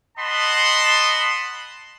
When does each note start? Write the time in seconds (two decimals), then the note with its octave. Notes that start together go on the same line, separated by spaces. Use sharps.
0.18 D#5 F#5 A5 B5 C6